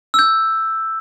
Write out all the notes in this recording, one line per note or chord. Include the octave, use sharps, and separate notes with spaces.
E6
G6